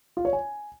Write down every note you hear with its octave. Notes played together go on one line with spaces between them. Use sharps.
F4
C#5
G#5